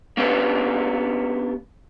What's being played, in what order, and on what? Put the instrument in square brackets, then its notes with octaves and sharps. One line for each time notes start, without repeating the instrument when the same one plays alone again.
[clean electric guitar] A#3 B3 C#4 D4 G4 B4